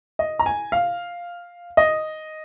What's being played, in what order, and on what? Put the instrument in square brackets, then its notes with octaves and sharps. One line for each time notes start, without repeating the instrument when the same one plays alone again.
[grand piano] D#5
A#5
G#5
F5
D#5